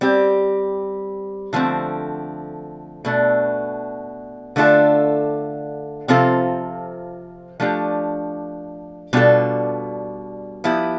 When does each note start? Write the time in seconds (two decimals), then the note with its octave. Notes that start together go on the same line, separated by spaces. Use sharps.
0.01 G3 C4 G4
1.53 D3 F3 A3 C4
3.05 B2 A3 D4
4.56 D3 A3 D4 F4 A4
6.08 C3 F3 C4 F4 A4
7.60 F3 A3 D4 G4
9.13 B2 G3 D4 F4 A4
10.64 F3 B3 E4 G4